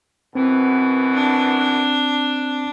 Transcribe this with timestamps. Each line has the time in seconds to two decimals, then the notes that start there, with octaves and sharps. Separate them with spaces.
0.35 F#2 B2 E3 C4
1.14 D4